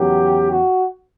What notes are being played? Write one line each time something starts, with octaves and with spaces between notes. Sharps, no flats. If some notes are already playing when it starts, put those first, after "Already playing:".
Already playing: E2 C#3 F#3 G4
F#4